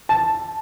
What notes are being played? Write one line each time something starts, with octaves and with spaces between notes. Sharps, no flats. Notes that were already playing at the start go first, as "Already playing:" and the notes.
A5